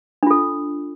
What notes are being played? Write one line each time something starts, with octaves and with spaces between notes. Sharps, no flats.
D4 F4 A4